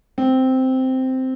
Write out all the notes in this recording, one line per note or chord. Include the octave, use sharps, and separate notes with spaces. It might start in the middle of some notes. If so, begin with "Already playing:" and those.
C4